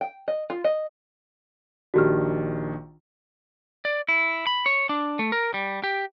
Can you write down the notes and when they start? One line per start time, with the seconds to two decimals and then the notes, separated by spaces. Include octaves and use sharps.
0.01 G5
0.28 D#5
0.50 F4
0.64 D#5
1.94 A#1 D#3 D4 F#4 G4 F6
3.85 D5
4.08 E4
4.47 B5
4.66 C#5
4.89 D4
5.19 A3
5.32 A#4
5.54 G3
5.84 G4